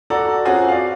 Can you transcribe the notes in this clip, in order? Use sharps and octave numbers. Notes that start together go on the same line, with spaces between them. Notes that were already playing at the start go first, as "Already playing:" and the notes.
F#4 A4 D5 A#5
C4 C#4 F4 F#4 G#4
D5 F5